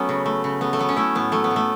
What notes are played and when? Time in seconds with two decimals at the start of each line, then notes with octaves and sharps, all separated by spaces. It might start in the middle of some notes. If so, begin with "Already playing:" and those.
Already playing: F#3 A3 B3 C#4
0.09 C#3
0.26 A3
0.44 C#3
0.61 A3 B3
0.73 A3
0.79 F#3 B3
0.89 C#4
0.97 A3 E4
1.15 A2 B3
1.32 F#3 A3
1.44 B3
1.51 F#3
1.56 A3